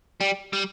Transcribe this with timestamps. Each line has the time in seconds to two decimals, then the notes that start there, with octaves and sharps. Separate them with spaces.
0.21 G3
0.53 G3